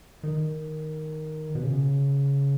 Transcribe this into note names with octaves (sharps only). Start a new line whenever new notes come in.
D#3
B2
C#3